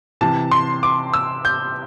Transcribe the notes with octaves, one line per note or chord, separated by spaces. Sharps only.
C3 E3 A5
C6
D6
E6
G6